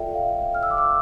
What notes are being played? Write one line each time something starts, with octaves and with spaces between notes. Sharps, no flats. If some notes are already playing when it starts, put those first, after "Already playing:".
Already playing: F4 A4 D5 E5 G5
F5
F6
E6
D6
E6